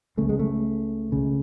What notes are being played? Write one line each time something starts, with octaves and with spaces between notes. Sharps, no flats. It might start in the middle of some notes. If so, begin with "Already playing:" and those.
C#2 C#3 A3
G#3
A3
C#2 C#3